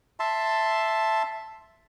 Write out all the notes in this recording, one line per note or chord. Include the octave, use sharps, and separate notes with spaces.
E5 A5 C6